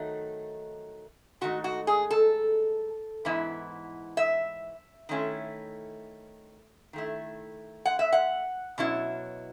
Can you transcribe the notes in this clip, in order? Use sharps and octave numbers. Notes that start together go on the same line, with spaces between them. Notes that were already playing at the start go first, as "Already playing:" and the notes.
Already playing: D#3 F#3 A3 D#4
G#2 D#3 A3 D#4 F#4
F#4
G#4
A4
G#2 E3 B3 E4
E5
D#3 A3 C#4 E4
D#3 A3 E4
F#5
E5
F#5
B2 F#3 C#4 E4